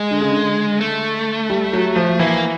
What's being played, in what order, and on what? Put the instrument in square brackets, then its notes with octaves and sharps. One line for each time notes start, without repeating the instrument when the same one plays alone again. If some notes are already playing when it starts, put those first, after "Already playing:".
Already playing: [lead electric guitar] G#3
[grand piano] D3
C#3
D3
[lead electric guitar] A3
[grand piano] G3
F#3
F3
[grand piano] E3 [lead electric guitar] A#3